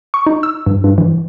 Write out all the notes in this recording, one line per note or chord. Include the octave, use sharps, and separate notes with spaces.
C#6
D#4
E6
G2
G2
E3